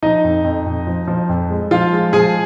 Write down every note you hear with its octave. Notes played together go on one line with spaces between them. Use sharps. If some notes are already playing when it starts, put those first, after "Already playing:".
F3 D#4 D#5
F2
F2
F2
F3
F3
F2
G#3
F3 F4 F5
G#3
F3 G#4 G#5